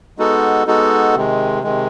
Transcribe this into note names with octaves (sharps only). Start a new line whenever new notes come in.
G#3 B3 D#4 F#4 A4
G#3 B3 D#4 F#4 A4
C3 D#3 G#3
C3 D#3 G#3